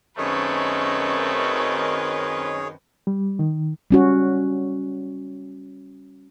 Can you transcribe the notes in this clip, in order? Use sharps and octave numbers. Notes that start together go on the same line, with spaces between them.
F#2 D#3 A3 C4 G#4 B4 C#5
G3
D#3
G3 C#4 F#4